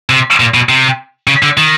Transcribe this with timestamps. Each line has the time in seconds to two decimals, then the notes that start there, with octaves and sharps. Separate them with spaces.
0.10 C3
0.40 A#2
0.54 B2
0.69 C3
1.27 C#3
1.43 D3
1.57 D#3